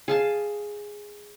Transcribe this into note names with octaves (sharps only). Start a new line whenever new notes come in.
G#4 F5 A5